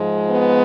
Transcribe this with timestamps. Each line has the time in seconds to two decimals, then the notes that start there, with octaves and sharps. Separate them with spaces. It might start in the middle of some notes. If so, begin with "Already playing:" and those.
Already playing: G#2 F3 G#3
0.31 B3